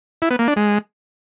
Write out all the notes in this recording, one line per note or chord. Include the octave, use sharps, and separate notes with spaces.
E4
B3
A#3
D4
G#3